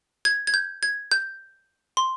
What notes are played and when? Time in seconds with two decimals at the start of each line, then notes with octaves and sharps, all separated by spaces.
0.25 G#6
0.47 G#6
0.54 G6
0.83 G#6
1.12 G6
1.97 C6